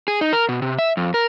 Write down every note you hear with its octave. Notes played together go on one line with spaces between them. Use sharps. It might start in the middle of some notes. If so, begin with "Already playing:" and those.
G#4
D#4
A#4
B2
C3
E5
F2
A#4